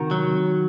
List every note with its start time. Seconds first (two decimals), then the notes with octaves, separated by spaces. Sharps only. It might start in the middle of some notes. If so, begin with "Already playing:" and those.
Already playing: C3 D#3 F#4 A#4
0.11 F#3